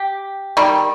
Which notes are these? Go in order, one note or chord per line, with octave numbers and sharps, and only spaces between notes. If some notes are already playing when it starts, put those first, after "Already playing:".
Already playing: G4
D#3 G3